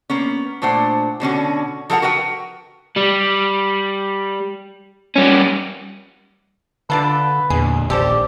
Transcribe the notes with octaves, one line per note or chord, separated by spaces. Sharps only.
A#3 B3 C#4
A#2 A3 D4 C5 F#5
B2 D3 C#4 F#4
F3 A4 A#4 F#5 A#5
F#4 A#4 B4 F#5 G5
G3
G3 C#4
D3 D4 F4 A4 B4
E2 A#2 D3 G#4
D#1 A#1 C4 G4 A4 C5 D5